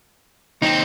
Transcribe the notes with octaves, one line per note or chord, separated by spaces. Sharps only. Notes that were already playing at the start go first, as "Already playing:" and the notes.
D#2 C4 D#4